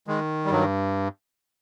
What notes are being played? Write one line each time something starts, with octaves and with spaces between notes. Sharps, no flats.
D#3 G#3
G3
G2 F#3